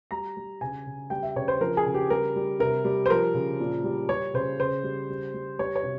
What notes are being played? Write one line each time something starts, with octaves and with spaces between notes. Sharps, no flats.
G3 A#5
G3
C#3 G#5
C#3
G3 G5
E5
C#3 C#5
C5
F3 A#4
G#4
C#3
G4
G3 A#4
G3
C3 A#4
G3
C5
F3 A#4
C#3
A#2
G3
G3 C#5
C#3 C5
C#3 C5
G3
G3
G3
G3 C#5
C#5
C3